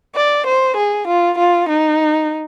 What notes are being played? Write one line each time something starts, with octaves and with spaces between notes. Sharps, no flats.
D5
C5
G#4
F4
F4
D#4